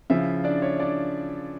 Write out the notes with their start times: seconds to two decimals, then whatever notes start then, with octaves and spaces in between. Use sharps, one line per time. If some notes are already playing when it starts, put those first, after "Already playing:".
0.10 C#3 F3 E4 E5
0.44 D4 D5
0.62 C#5
0.79 D4 D5